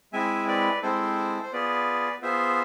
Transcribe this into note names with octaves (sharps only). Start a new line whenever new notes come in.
G#3 C4 E4 E5 G#5
B4 D5
G#3 C4 E4 A4 C5
C5
B3 F4 G#4 B4 D5
B3 F4 G#4 C5 E5